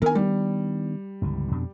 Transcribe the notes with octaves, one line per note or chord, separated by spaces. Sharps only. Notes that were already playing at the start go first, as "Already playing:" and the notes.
D#3 B3 D4 A#4 G#5
G3
G1 C#2 E3
F2 B2 D4